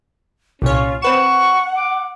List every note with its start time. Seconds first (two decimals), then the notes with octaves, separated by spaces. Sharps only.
0.62 C2 A#2 C#4 F4 C#5
1.02 C4 B4 F#5 C#6 E7
1.77 D6